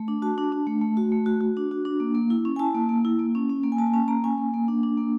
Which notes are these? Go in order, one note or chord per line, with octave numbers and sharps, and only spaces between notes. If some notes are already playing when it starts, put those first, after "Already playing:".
Already playing: A3
D4
F#4 A5
D4
D4
A3
A3
F#4
A3
F#4
F#4
D4
F#4
D4
A#3
A#3
E4
C#4
G#5
E4 A5
A#3
A#3
E4
A#3
C#4
C#4
A#3
G#5
A#3 A5
G#5
C#4 A5
A#3 A#5
C#4 G#5
A#3
A#3
D4
D4
A#3